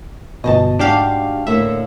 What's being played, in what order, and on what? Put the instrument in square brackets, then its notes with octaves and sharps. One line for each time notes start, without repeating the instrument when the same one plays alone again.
[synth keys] G1 B2 [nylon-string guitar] D#5 G5 A5
[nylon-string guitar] G#2 F#4 [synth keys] D4 G4 F5
[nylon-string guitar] A2 D3 A#3 [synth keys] E5